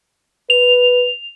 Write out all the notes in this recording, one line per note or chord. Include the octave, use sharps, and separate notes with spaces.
B4 F7